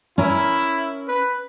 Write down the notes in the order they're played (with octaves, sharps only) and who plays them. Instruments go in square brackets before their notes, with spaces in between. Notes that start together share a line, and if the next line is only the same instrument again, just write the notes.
[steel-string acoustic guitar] C#4 A#4 [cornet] E4
[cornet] B4